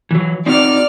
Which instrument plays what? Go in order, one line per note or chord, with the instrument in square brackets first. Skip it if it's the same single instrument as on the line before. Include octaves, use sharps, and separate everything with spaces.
[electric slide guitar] E3 F#3
[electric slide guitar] C4 D#4 F#4 [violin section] D5 F6